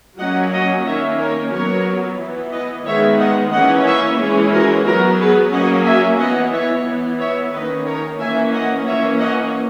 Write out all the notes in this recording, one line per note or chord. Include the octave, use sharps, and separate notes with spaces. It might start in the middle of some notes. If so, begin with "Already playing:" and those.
F#3 A#3 C#4 D#5 F#5
D#5 F#5
D#3 A#3 C#4 C#5 E5
A#4 C#5
F#3 B3 A#4 C#5
E3 B3
B4 D#5
D#3 G#3 B3 C#5 E5
D#5 F#5
E3 A#3 C#4 D#5 F#5
C#5 E5
E3 G#3 C#4
F#4 A#4
F#3 B3 F#4 A#4
G#4 B4
F#3 A#3 C#4 D#5 F#5
E5 G#5
E3 B3 D#5 F#5
C#5 E5
E3 B3
C#5 E5
D#3 A#3 C#4 B4 D#5
A#4 C#5
E3 A#3 C#4 E5 G#5
D#5 F#5
E3 A#3 C#4 C#5 E5
D#5 F#5